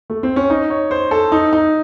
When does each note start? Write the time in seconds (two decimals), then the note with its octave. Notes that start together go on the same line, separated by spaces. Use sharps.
0.10 A3
0.23 C4
0.36 C#4
0.50 D#4
0.70 C#5
0.91 C5
1.11 A4
1.32 D#4
1.53 D#4